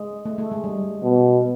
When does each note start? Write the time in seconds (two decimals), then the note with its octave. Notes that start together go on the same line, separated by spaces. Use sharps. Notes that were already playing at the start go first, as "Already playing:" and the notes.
Already playing: G#3
0.25 A3
0.38 A3
0.51 G#3
0.64 G3
1.03 B2